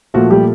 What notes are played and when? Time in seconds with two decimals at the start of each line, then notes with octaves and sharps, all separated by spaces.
0.14 A#2 F3 A3 F#4
0.31 G3 G4